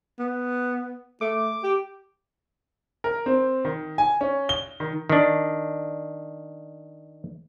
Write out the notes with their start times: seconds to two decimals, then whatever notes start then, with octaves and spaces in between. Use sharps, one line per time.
0.19 B3
1.21 A3 D6
1.63 G4
3.04 A#4
3.26 C4
3.65 D#3
3.98 G#5
4.21 C#4
4.49 G7
4.80 D#3
5.10 D#3 D4